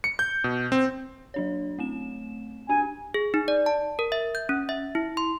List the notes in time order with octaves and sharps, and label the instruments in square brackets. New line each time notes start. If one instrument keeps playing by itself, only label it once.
[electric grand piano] C#7
G6
B2
C4
[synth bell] F#3 D4 C#5
A3 C4 E7
[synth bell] D4 G4 [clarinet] G#5
[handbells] G#4
D#4
D5
A5
A#4
E5
G6
C#4
E5
E4
C6